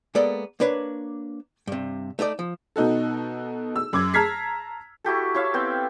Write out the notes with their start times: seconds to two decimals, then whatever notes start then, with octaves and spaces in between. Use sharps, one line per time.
0.15 G#3 A#3 B3 A4 D5
0.60 A#3 D4 B4 C#5
1.67 G2 C3
2.19 A3 D#4 C5 D5
2.39 F3
2.76 B2 D#4 F#4 A4
3.76 E6
3.93 F#2 D6 G#6
4.14 A5 A#5 F6 G#6 B6 C7
5.04 E4 F#4 G4 A4
5.34 E4 C#5 E5 F5
5.54 B3 C4 G5